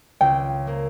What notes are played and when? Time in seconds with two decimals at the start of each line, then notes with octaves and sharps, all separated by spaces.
0.21 C#2 G5
0.67 A#3